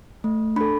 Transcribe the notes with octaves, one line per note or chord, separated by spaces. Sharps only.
A3
D4 A4 B5